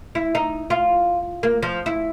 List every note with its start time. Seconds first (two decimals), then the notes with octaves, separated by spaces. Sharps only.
0.15 E4
0.35 D#4
0.70 F4
1.43 A#3
1.63 F3
1.86 E4